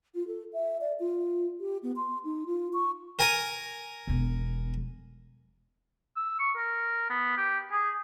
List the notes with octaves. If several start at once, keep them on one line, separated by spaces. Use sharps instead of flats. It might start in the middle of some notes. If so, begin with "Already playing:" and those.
F4
A4
E5
D5
F4
G4
B3
C6
D#4
F4
C#6
A#4 G#5 A#5
E1 B3
E6
C#6
A#4
B3
G4
G#4